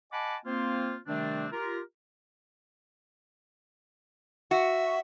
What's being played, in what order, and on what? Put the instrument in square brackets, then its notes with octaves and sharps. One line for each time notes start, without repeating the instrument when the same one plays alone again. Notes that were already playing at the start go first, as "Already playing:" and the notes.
[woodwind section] D#5 F#5 G#5 A5 B5 D6
A#3 C4 F4 C5
C3 D#3 G3 A3 C4 D4
F4 G4 A#4
[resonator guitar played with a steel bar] F#4 [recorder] E5